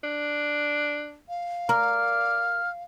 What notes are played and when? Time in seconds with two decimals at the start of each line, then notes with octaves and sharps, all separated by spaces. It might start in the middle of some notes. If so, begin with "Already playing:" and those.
0.04 D4
1.29 F5
1.69 A#4 D5 F6